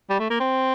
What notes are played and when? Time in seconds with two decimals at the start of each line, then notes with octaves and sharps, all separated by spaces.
0.10 G3
0.20 A3
0.30 A#3
0.40 C4